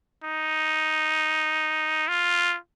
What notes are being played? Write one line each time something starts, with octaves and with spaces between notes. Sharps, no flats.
D#4
F4